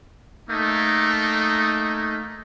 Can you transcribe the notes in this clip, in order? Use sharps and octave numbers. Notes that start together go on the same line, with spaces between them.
A3 A#3 D#4